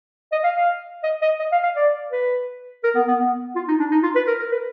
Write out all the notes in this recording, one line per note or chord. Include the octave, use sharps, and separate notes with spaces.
D#5
F5
F5
D#5
D#5
D#5
F5
F5
D5
B4
A#4
B3
B3
B3
F4
D#4
D4
D#4
F4
B4
A#4
A#4
B4